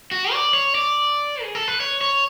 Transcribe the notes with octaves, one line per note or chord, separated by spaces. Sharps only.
F#4
D5
C#5
D5
G#4
A4
B4
C#5
C#5